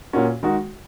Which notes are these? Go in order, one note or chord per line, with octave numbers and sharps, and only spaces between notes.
A#2 A#3 C#4 F#4
D#3 G#3 D#4 F#4